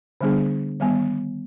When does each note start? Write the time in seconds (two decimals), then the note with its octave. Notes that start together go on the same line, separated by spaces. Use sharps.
0.21 D3 G3 B3 D4 G#4
0.80 D#3 G3 B3